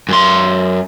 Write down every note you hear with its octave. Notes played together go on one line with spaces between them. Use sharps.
F#2 C6